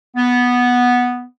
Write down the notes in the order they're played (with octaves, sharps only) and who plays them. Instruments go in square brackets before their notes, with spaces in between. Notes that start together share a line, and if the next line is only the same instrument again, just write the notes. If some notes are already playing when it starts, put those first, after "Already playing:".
[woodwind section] B3